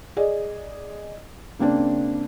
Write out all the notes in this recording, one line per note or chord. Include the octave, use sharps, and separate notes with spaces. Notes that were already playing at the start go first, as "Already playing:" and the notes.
G#4 D5 D#5
C#3 A#3 C4 D4